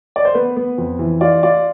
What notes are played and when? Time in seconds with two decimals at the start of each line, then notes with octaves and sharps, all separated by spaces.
0.16 D5
0.25 C5
0.35 B3 B4
0.56 B3
0.78 F2
0.99 E3
1.21 F4 D5
1.43 F4 D5